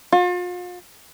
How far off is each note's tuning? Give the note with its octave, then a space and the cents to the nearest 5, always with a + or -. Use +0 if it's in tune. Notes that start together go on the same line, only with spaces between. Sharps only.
F4 +40